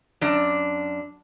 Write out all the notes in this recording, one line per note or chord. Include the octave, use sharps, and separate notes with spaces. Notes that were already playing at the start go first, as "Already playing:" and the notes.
F#2 D4